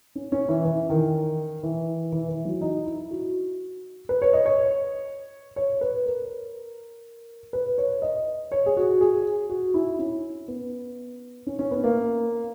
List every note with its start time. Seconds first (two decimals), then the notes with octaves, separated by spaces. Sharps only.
0.15 C#4
0.32 C#4
0.49 E3
0.65 E3
0.90 D#3
1.63 E3
2.12 E3
2.28 E3
2.45 F#3
2.61 D#4
2.86 E4
3.11 F#4
4.09 B4
4.22 C#5
4.33 D#5
4.46 C#5
5.56 C#5
5.81 B4
6.06 A#4
7.53 B4
7.78 C#5
8.02 D#5
8.52 C#5
8.66 G#4
8.77 F#4
9.01 G#4
9.49 F#4
9.74 E4
9.99 C#4
10.48 B3
11.47 C#4
11.59 C#4
11.71 B3
11.84 A#3